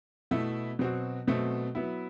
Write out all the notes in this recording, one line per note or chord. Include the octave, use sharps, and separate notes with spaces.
B2 A3 E4
B2 F#3 C4 F#4
B2 F#3 A3 C4
F#3 B3 E4